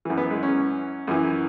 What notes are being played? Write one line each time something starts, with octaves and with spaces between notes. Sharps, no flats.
F#2 E3
B3
G#3
C#4
F#2 E3